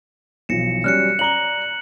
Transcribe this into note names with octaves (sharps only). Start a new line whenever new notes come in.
B1 E3 F3 A#6 C#7 E7
F#3 G3 C#4 F6 F#6 C#7
D5 A#5 F#7 G7